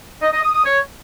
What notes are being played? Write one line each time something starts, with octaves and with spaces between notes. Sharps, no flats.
D#5
D#5
D#6
D#6
C#5